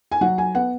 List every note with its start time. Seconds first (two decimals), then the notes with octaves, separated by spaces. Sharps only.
0.12 G#5
0.21 F#3 F#5
0.38 G#5
0.55 B3 F#5